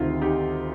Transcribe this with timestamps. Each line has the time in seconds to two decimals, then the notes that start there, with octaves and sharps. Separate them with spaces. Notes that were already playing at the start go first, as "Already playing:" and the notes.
Already playing: D2 C3 D#3 F4
0.22 D#4 G4